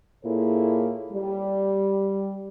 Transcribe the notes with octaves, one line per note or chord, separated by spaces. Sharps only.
A#2 A#3 E4 G#4 A4 C#5
G3